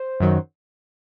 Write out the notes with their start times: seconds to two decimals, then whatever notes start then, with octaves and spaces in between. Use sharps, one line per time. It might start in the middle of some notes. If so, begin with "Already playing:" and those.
Already playing: C5
0.20 F#2 D#3 F#3